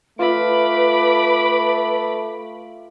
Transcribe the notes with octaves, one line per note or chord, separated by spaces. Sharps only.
A3 F4 B4 E5 B5 D6